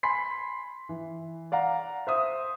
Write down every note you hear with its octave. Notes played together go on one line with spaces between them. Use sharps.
G#5 B5 C6 B6 C7
E3
D5 F5 F#5 A#5
C5 E5 D#6